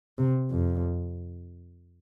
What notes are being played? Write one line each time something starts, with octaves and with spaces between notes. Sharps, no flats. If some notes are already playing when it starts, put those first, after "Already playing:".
C3
F2